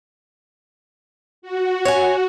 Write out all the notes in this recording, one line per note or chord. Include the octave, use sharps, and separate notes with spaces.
F#4
C#5 G#5